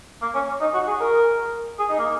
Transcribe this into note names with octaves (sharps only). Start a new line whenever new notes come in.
A#3
C#4
D#4
F#4
G#4
A#4
G#4
D#4
A#3